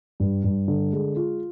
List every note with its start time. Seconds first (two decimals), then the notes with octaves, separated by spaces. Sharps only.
0.20 G2
0.44 G2
0.68 D3
0.93 G#3
1.16 F4